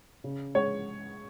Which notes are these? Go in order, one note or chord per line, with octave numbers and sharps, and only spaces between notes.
C#3
G#3 C#5